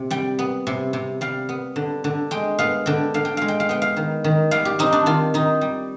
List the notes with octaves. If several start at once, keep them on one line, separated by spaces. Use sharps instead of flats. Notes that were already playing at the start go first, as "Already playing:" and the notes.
Already playing: C3
G3 G5
B3
C3
C3
G3 F5
B3
D3
D3
G#3 G5
B3 F5
D3 G5
D3 F5
G5
G#3 F5
G5
F5
B3 G5
F5
D#3
D#3
G3 F5
G4
C4 D#4
D4
D#3 F4
D#3 D#4
G3